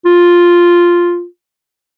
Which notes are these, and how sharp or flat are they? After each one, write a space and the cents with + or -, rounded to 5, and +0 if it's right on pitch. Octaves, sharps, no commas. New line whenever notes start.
F4 +0